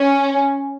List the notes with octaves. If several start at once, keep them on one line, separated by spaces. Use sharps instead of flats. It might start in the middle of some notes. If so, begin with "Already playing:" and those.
Already playing: C#4